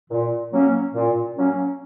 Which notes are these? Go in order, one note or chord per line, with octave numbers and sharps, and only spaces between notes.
A#2
F#3 A#3 C#4
A#2
F#3 A#3 C#4